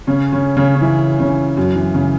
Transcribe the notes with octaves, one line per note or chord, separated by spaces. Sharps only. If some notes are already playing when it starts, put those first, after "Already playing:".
C#3 C#4
C#3 C#4
C#3 C#4
C#4
E3 E4
C#3 C#4
F#2 F#3
E3
C#3